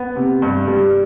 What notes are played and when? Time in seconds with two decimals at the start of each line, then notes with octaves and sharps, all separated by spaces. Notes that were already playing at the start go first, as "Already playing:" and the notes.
Already playing: B3
0.16 C3
0.42 G2
0.68 G3